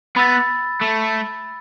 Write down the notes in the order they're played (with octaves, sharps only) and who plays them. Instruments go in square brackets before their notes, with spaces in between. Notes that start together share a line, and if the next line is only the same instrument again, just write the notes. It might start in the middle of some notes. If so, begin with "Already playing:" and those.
[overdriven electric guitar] B3 [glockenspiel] B5 E6 A6
[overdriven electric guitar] A3